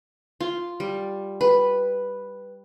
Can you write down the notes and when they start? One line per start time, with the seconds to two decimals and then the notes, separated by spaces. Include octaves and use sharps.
0.40 F4
0.80 G3
1.41 B4